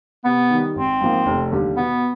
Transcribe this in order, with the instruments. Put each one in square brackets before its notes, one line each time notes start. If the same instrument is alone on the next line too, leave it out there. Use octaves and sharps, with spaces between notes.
[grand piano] C3 [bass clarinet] B3
[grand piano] D#3 G3
[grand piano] G#1 [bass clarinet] C4
[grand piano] G#2 F3 A#3
F1
D#2 D3 G3
[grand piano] B2 [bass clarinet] B3